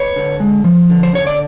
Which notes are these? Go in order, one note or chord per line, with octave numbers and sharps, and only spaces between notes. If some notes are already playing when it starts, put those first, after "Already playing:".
Already playing: B4 C#5
D3
G#3
F3
D3
C5
D3 C#5
D5